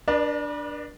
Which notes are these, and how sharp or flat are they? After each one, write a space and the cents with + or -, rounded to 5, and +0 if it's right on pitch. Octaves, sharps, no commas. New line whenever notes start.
D4 +0 B4 -40 D5 +40